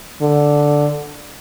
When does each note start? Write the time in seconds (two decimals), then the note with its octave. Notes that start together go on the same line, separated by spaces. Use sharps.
0.22 D3